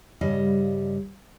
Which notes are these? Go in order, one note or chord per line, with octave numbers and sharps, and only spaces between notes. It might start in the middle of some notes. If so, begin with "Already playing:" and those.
G2 C#3 G3 D#5